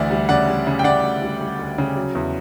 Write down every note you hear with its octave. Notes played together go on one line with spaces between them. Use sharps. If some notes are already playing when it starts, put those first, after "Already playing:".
Already playing: D2 E3 D5 F#5
G3
C#3 D5 F#5
G3
C#3
G5
C#3 D5 F#5
D2
G3
G3
D2
C#3
F#3
E2